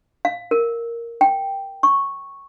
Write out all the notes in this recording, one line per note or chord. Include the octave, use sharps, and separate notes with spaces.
F5
A#4
G5
C#6